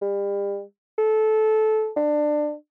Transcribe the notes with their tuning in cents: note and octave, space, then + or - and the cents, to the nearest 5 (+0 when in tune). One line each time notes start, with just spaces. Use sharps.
G3 +35
A4 -15
D4 +20